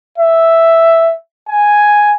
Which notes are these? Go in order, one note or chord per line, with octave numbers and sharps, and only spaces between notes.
E5
G#5